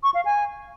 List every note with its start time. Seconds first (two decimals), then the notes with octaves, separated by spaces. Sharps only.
0.03 C#6
0.14 F5
0.25 G#5